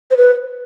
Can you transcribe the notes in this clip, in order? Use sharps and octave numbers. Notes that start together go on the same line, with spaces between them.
C5
B4